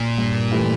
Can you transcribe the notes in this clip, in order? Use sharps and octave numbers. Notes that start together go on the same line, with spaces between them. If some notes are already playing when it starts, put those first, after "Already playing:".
Already playing: A#2
G2
E3 A3 E4 G4